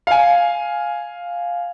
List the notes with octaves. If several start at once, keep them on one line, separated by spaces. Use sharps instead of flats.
F5 G#5